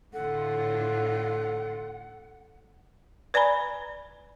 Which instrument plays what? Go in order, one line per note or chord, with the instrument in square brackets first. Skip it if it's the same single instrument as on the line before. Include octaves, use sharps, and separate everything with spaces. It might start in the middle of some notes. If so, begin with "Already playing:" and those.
[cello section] A2 D3 F4 [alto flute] A4 [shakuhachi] F#5
[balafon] B4 D5 G#5 A#5 B5